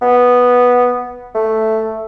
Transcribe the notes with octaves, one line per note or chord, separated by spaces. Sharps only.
B3
A3